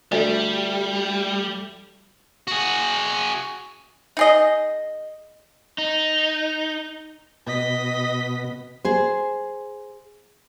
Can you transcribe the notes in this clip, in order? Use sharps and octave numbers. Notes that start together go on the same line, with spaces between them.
D2 G3
F#4 G#4
D#4 G#4 D#5
D#4
B2 D#5 B6
G#4 C5